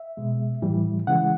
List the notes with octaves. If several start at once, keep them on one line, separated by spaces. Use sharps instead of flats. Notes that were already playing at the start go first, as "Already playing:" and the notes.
Already playing: E5
B2 G#3
A2 E3 G3
C#3 E3 G#3 F#5